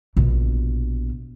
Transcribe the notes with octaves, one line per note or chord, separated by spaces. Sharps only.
A#1 B2